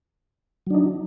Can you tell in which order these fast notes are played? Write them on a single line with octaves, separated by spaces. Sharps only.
F#3 D4 D#4